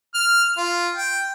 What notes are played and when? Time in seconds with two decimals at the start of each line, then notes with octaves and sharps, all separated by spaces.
0.15 F6
0.58 F4
0.97 G5